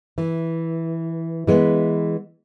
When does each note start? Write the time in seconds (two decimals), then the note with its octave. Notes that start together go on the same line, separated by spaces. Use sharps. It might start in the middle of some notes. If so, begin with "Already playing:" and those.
0.18 E3
1.47 E3 G#3 B3